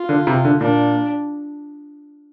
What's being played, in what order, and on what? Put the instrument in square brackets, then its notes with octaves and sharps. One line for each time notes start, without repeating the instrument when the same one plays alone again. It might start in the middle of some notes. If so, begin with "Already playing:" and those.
Already playing: [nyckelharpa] F4
[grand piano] D3
C3
D3
[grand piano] A#2 [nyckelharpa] D4